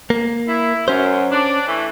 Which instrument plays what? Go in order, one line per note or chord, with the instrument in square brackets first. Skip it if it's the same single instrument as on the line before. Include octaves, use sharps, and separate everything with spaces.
[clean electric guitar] A#3
[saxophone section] E4
[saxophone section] F#2 [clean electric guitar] C#4 C5
[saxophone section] D4
E3 A3